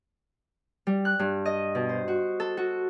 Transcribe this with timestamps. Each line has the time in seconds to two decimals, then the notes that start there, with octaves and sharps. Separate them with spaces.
0.87 G3
1.05 F#6
1.19 G2
1.46 D#5
1.75 B2
1.89 C5
2.08 F#4
2.40 A4
2.57 F#4